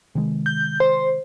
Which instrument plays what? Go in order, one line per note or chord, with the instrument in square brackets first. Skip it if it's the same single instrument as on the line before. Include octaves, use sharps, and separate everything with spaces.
[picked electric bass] C3 D#3 G#3
[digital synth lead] G6
C5